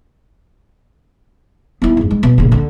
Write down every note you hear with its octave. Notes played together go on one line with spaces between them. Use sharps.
B3 E4
F2 G#2
G#3
B2
A#1 C#3
D3